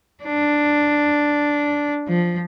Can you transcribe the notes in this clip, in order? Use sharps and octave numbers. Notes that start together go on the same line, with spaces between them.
D4
F3